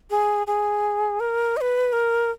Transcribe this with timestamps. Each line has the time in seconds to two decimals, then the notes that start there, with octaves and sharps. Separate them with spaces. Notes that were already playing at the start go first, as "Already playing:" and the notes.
0.11 G#4
0.47 G#4
1.20 A#4
1.57 D#5
1.61 B4
1.93 A#4